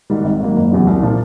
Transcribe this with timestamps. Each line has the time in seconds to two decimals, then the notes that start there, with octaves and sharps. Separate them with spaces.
0.10 G#2 D#3 G3
0.25 G#1
0.41 G#2 D#3 F#3 A#3
0.56 F#1
0.72 E2 C#3 F#3
0.87 C2
1.02 A#2 F3 A#3